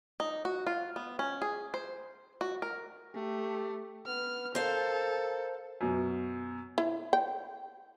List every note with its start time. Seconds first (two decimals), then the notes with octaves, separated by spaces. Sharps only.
0.20 D#4
0.45 F#4
0.67 F4
0.96 B3
1.19 C#4
1.42 G#4
1.74 C5
2.41 F#4
2.62 A#4
3.15 A3 G4
4.07 B3 F6
4.55 A4 A#4 C5 F5
5.81 F#2 B2
6.78 E4
7.13 G5